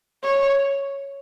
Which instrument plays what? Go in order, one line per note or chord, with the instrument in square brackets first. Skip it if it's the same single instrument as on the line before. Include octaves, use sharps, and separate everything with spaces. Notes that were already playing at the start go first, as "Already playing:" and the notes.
[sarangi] C#5